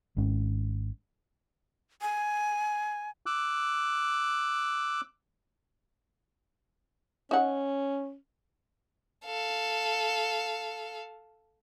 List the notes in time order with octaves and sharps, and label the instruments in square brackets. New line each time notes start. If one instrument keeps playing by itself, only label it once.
[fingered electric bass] G#1 G#2 C#4
[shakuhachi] G#5
[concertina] D6 E6 F#6
[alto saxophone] C#4 [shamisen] D#4 F#5
[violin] A4 F5